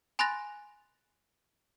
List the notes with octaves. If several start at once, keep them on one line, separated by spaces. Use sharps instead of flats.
G#5 B5 C6 F#6 A6 A#6